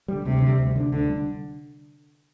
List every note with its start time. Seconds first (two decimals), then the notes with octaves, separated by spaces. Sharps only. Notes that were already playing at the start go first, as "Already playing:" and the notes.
0.08 D3 G3
0.25 D2 C3
0.42 D3 G3
0.59 D2
0.76 D3 G3
0.80 D4
0.92 D2 D3
1.09 D3 G3 D4